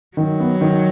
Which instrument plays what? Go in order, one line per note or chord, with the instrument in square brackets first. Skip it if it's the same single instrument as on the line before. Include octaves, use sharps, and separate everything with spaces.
[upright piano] D#3 [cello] F#3
[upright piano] B3
D#3